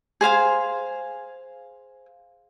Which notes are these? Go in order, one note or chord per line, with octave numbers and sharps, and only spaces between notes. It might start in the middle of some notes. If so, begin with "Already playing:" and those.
G#4 C5 F5 G#5